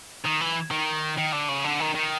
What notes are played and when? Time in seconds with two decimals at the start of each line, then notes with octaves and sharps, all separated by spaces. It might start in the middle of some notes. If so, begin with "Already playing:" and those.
0.25 D#3
0.40 E3
0.71 D#3
1.17 D#3
1.32 D3
1.48 C#3
1.64 D3
1.80 D#3
1.95 D#3